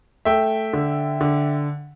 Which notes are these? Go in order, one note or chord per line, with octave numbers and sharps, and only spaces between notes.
A3 E5 G5
D3
D3